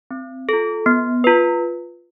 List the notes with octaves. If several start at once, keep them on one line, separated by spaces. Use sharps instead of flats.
C4
F4 A4
B3
F4 B4